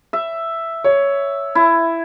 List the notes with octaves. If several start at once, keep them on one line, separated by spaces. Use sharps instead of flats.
E5
C#5
E4